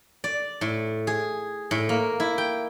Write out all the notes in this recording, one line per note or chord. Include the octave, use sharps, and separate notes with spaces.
D5
A2
G#4
A2
A#3
E4
G5